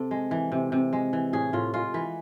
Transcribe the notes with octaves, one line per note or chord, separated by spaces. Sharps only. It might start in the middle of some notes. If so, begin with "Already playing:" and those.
Already playing: C3 A4
G#3
E3
C3
C3
G#3
E3
A2 G#4
A2 F4
G#3 F4
E3 B4